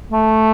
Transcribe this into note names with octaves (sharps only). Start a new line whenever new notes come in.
A3